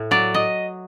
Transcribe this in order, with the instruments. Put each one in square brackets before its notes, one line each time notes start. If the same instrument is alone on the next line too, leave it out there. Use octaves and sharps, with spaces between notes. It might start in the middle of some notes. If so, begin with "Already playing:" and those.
Already playing: [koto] A2
F#3 D5
D#5